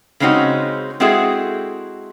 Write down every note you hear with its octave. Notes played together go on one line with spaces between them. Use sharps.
C#3 G#3 C4 C#4 D#4 F#4
G#3 C4 E4 F#4 G#4 A4